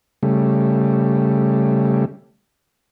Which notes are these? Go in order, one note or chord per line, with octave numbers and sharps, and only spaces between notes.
C#3 G3 A3